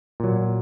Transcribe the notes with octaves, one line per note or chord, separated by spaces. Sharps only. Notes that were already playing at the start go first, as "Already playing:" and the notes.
A#2 F#3